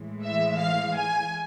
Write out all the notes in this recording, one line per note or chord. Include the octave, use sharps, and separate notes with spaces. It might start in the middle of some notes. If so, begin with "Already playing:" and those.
Already playing: A2 E3 G#3
E5
F5
G#5